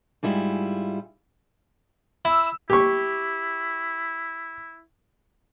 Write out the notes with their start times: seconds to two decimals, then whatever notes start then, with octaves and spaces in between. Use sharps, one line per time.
0.23 G#2 G3 E4 F4 G#4
2.25 E4 E6
2.70 E4 G4 C#6